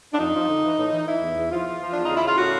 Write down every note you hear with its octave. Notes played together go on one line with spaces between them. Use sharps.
D4
F2 D#4
F3
D3
E3
A2
E3
E3 E4
E2
E2
F3 F4
F3
F3
E2 D4
D#4
C#3
E4
C#3 F4
A2 F#4